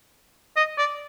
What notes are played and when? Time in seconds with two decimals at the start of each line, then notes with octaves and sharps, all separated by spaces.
0.56 D#5
0.78 D5